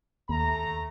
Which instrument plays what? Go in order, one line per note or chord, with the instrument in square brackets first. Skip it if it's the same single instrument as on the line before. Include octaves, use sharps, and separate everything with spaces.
[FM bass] D#2 [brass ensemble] A3 A#5